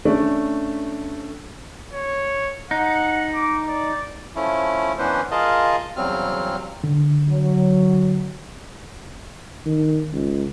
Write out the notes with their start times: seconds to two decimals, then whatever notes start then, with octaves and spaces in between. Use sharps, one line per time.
0.05 A3 C#4 D4
1.93 C#5
2.71 D#4 F#5
3.34 D6
3.68 D5
4.36 F3 A3 C#4 E4
4.98 E3 B3 C#4 D4 B4 C5
5.31 F4 G#4 A#4 D#5 F5 A5
5.96 E2 C#3 F#3 G3 C4 F6
6.84 D3
7.28 F#3
9.66 D#3
10.13 C#2